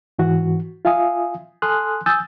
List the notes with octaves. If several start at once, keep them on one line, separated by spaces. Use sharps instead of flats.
G#2 E3 F#4
F4 E5 F5 G#5 D#6
A4 G#5 C6 D#6 F6 F#6
G#5 D#6 E6 G6 A6